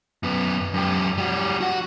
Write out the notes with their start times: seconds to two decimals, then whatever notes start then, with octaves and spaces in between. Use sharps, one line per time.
0.23 F#2 B3
0.74 F#2 G4
1.18 G3 F#4
1.61 F#4 F#5